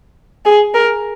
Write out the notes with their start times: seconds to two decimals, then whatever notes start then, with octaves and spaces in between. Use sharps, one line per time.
0.45 G#4
0.74 A#4